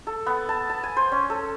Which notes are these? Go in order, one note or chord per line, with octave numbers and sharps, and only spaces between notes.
A4
B3
A5
A5
G#5
C5
C#4
A4